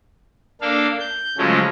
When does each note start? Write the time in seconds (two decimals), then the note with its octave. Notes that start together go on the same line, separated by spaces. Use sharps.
0.61 A#3 D4 A4 F5
1.00 G6
1.38 C#3 F3 F#3 G#3 A3 C#4